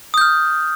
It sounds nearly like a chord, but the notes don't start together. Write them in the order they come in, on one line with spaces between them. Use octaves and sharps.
D#6 G6 F6